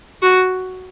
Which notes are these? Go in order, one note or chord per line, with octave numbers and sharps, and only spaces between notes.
F#4